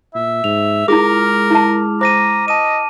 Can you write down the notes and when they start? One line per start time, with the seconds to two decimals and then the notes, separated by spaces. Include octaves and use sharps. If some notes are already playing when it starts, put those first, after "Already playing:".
0.15 A#2 E5
0.44 G#2 F7
0.88 G#3 E4 F4 G#4 A#4 D6 F6
1.51 E4 A5
2.01 C5 A#5 D6 A#6 D#7
2.48 D#5 A5 D#7